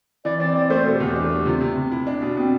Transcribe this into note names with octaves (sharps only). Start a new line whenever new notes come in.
E3 D5
C4 D5
C4 D5
A3 C5
B2 A4
G4
E2
G4
D4
A3
C3 F4
C3
C3
E4
D4
B2
B2 C4